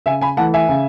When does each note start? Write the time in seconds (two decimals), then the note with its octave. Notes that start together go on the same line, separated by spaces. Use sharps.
0.06 C#3 E5 G#5
0.21 G#5 B5
0.37 E3 A3 F#5 A5
0.54 E5 G#5
0.69 C#3